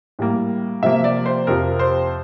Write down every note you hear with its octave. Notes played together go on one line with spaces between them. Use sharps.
A2 G3 A#3
C3 F3 A#3 E5
D5
C5
F2 C3 F3 A#4
C5